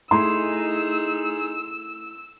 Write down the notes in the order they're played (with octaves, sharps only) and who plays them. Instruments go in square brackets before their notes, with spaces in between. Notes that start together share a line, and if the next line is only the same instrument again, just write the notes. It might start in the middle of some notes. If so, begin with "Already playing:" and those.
[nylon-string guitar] A3 E4 [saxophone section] D#4 G#4 [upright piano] C6 [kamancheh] E6